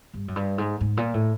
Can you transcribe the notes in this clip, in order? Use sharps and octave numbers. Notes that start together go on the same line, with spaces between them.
G2
F#2
G2
G#2
G#2
A#2
A2